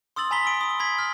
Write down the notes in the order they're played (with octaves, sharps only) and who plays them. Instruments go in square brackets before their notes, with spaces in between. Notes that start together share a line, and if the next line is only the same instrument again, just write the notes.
[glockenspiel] C6 D#6 E6 A6 F#7
G#5 A#5 B5 B6 G7
E6 D7
B5 D#6
B5 G#6 B6
F6